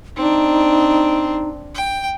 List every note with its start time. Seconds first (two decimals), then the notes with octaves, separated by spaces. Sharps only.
0.17 C4 D4 D#4
1.75 G5